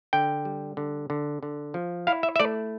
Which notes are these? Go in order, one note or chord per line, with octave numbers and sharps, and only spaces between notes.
D3 G5
G3
D3
D3
D3
F3
E4 F5
E5
E5
A3 D5